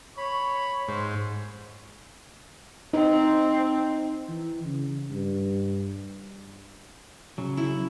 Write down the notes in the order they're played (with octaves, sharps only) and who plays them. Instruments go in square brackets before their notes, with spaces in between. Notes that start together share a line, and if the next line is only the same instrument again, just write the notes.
[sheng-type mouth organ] C#5 [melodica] B5 [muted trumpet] C#6
[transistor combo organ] G#2 [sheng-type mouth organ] C5
[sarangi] C4 [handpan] D#4
[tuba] E3
C#3
G2
[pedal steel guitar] C#3 F#3
[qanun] E4